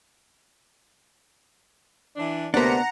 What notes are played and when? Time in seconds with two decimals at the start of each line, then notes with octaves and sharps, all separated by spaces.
2.16 E3 D4
2.54 D2 C3 A#3 B3 D4 F#5 A#5